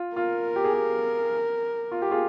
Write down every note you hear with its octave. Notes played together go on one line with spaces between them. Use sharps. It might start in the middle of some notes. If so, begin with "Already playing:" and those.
Already playing: F4
F4 A#4
G4
G#4
G4
F4
G4
F4 G#4